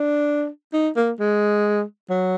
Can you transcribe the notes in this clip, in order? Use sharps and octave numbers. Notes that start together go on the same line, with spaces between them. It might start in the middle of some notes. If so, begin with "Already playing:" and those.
Already playing: D4
D#4
A#3
G#3
F#3